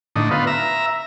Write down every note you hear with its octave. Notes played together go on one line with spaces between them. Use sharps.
A2 D3 D#4
B3 F4
E5 A#5